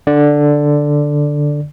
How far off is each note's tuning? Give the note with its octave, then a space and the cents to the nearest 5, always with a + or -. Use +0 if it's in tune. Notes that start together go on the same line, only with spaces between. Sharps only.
D3 +0 D5 +0